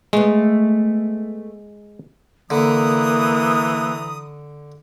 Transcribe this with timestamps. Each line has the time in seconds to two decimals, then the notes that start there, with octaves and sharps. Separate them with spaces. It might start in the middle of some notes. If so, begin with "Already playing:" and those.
0.13 G#3 A3 B3
2.50 D3 E3 A#3 A#5 B5 D#6